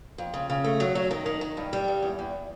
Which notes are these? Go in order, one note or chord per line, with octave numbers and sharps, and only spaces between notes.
F2
C#3
C#3
A3
F#3
F#3
D#3
D#3
D#3
G2
G3
G2
E2
E2